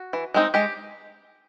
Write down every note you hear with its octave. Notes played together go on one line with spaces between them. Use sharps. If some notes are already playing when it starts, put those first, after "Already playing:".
Already playing: F#4
E3
G#3 C4 D#4
G#3 G4